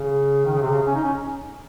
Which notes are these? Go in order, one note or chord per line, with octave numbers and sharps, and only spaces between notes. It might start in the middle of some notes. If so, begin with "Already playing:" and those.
Already playing: C#3
D#3
C#3
C3
C#3
C#4
D#4
C#4